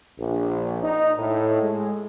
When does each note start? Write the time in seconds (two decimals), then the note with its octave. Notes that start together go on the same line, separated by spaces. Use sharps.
0.19 A#1
0.83 D#4
1.19 A2
1.62 G#3